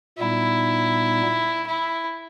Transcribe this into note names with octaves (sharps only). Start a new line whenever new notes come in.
A#2 G3 B3 D#4 E4
E4